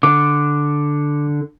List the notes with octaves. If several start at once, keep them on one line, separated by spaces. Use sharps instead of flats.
D3 D6